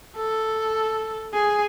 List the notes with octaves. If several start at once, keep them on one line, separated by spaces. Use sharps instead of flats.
A4
G#4